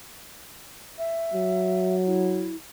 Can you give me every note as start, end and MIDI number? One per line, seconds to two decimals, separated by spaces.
0.98 1.96 76
1.34 2.53 54
2.06 2.56 64